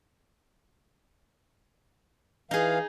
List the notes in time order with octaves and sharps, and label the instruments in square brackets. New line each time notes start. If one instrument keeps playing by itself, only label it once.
[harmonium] E3 F5 [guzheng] D#4 G#4